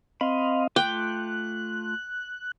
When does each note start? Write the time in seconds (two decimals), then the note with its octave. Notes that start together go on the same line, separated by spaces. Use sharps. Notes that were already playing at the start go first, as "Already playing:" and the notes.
0.21 C4 D#5 F5 B5 C6
0.76 A3 F4 G5 D6 F#6